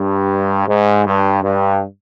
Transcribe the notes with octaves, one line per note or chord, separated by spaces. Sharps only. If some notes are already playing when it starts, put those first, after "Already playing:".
Already playing: G2
G#2
G2
G2